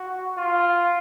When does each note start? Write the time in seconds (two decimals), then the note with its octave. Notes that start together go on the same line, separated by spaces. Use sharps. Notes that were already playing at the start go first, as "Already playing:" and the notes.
Already playing: F#4
0.37 F4